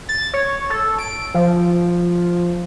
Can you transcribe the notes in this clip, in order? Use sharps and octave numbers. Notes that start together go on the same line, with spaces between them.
A6
C#5
A4
D7
F3